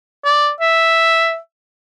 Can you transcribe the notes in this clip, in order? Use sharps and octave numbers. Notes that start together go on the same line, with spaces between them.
D5
E5